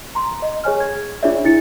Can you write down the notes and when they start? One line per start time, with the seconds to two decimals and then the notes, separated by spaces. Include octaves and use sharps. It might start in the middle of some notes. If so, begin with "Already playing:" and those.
0.15 A#5 C6
0.42 D#5
0.64 G#4 C#5 G#5 F6
0.80 G#6
1.23 D4 F4 G#4 C#5 D5 E5
1.44 D4 E4 A6 C#7